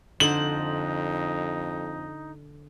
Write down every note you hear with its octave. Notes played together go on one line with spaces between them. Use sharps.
F2 D3 D#4 C5 F#7